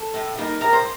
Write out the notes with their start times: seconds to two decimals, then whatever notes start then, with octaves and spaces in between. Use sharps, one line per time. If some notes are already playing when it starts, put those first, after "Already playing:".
Already playing: A4
0.14 A2
0.37 G3 A#3 D#4
0.61 A2 A#4
0.73 C5